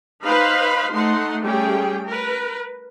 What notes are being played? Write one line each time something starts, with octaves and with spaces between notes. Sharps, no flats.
D#4 B4 C5 F5 B5
A3 D#4 F#5 C6
G3 A3 C#4 G4 G#4 G5
A#4 B4